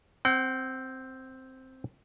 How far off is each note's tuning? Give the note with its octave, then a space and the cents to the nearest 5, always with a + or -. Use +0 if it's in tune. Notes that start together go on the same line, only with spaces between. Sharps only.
C4 +0 F#5 +45